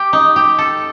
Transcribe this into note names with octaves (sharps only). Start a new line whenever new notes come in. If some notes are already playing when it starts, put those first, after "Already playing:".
Already playing: G4
D#4
G4
A4